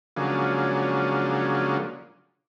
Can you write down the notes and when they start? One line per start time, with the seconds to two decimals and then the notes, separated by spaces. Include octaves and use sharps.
0.17 C#3 F3 F#3 G#3 A#3 D4